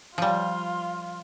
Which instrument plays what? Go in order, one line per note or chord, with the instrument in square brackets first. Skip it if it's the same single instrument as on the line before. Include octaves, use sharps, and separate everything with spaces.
[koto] F3 G3 [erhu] F4